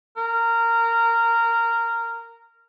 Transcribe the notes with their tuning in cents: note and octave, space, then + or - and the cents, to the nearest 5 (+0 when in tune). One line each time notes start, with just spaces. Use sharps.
A#4 -15